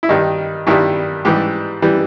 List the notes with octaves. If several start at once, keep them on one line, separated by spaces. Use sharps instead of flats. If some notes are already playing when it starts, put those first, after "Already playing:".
E4
G2 D#3 G3 D#4
G2 D#3 G3 E4
G#2 E3 G3 G4
E3 G3